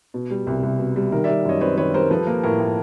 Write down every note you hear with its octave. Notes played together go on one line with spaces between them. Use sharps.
B2
G3
C2
C2
B2
G3
D#3 A#4
D5 E5
G3
F#2 C#5 D#5
C4 B4 C#5
D#3 B4 C#5
G3 A#4 C5
F3 A4 B4
A#3 A#4
A2 A#4
A2